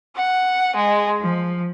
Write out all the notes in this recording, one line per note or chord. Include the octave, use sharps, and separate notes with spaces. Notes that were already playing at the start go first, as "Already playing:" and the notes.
F#5
G#3
F3